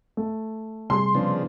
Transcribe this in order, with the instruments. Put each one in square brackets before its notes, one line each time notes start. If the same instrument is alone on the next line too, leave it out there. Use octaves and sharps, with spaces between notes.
[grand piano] A3
[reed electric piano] C3 G3 G#4 [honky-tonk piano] C6
[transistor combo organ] C#3 F3 D4 [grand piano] B3